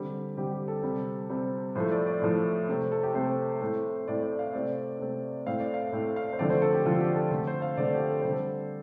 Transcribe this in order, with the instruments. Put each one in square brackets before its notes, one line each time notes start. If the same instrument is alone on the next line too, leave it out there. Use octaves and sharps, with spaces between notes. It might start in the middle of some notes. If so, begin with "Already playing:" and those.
Already playing: [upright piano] D3 G3 C4
D3 G3 C4 G4
G4
A4
C3 G3 C4
C3 G3 C4
A2 F3 A3 C5
D5
D5
A2 F3 A3
C3 A3 C4
A4
G4
C3 A3 C4 C5
A2 A3 C4
A2 A3 C4 D5
D5
F5
C3 A3 C4 D5
C3 A3 C4
A2 A3 C4 F5
D5
F5
A2 A3 C4 C5
F5
C5
D3 F3 A3 C4 D5
C5
A4
G4
D3 F3 A3 C4 F4
G4
A4
D3 A3 C4 A4
C5
F5
D3 A3 C4 D5
G4
A4
D3 G3 C4 C5
A4